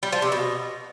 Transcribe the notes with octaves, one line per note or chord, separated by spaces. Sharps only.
G3
F3
C3
B2